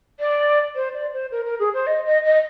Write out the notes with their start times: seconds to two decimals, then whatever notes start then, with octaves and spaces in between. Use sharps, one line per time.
0.20 D5
0.76 C5
0.94 D5
1.13 C5
1.31 A#4
1.45 A#4
1.59 G#4
1.74 C5
1.87 D#5
2.05 D#5
2.25 D#5